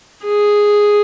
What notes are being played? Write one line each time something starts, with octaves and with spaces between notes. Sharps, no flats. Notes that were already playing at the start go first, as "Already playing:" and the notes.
G#4